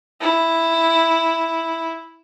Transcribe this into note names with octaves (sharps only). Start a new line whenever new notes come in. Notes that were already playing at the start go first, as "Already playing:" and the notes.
E4